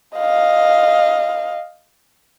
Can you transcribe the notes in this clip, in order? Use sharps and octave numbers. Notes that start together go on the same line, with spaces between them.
D#5 F5